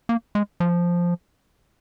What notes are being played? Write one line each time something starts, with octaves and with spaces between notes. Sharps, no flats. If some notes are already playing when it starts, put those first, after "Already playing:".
A#3
G#3
F3